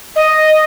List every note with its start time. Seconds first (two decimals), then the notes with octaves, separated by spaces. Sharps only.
0.16 D#5